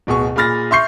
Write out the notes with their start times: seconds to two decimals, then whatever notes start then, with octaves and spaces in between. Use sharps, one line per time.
0.07 D1 B2 G#4 C#6
0.36 A#2 G#4 B5 F6 A6 A#6
0.71 E5 C6 C#6 G6 C7